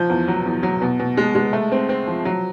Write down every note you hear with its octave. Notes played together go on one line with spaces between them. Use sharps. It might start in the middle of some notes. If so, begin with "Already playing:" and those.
Already playing: F3 G6
E2
F#3
E2
F#3
B2
B2
G#3
G#3
A3
C4
C4
F3
F#3